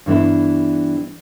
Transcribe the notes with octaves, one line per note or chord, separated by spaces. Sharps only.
G2 E3 B3 E4